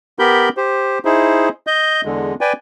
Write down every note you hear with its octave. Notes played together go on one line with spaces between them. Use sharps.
B3 G4 A#4 B5 G6
G4 C5
D#4 E4 G#4 C5
D#5 G6
E2 D3 G#3
B4 D5 G5 G#5